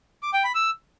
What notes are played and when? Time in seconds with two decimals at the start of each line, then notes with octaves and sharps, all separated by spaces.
0.23 D6
0.33 G5
0.44 B5
0.55 E6